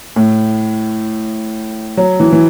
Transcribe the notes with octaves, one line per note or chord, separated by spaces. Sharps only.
A2
F#3
E3
E3